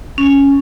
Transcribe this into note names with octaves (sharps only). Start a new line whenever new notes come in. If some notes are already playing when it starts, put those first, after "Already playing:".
C#4